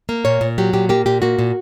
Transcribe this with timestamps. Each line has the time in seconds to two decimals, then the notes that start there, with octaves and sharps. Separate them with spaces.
0.09 A#3
0.25 A#2 C#5
0.41 A#2
0.58 F#3 G4
0.73 A#2 G4
0.89 A#3 G4
1.06 A#2 G4
1.22 A#3 F#4
1.39 A#2